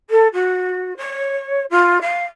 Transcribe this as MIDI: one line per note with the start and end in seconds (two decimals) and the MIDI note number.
0.10 0.27 69
0.33 0.97 66
0.97 1.64 73
1.70 1.98 65
2.01 2.23 77